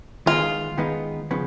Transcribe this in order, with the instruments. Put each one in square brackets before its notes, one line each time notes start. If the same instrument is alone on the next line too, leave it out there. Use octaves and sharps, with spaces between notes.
[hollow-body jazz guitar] D#3 G#3 B3 D#4 [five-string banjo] F4
[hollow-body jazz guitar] D#3 G#3 B3 D#4
C#3 F3 B3